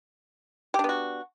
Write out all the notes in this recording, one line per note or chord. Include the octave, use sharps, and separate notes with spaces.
B3 D4 F#4 G4